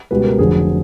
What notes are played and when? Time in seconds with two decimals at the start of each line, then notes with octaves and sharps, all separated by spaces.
0.11 C#2 B2 G3 B4
0.24 A#4
0.39 F1 F2 D3 F#3 G#4